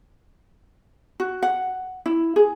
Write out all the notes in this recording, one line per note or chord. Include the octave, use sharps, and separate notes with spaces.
F#4
F#5
E4
G#4